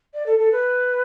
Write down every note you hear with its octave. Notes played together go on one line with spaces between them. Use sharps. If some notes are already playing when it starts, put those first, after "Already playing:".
D5
A4
A4
B4